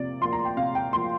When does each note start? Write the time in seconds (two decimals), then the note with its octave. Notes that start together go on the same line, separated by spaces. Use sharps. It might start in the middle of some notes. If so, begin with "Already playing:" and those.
Already playing: C3 F3 A#3 D5
0.21 F3 A#3 C6
0.33 A#5
0.45 G5
0.57 C3 F5
0.75 G5
0.92 F3 A#3 C6